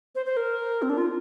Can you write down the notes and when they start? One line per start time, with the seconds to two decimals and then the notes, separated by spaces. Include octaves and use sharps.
0.15 C5
0.26 C5
0.37 A#4
0.82 C4
0.90 D4
0.98 F4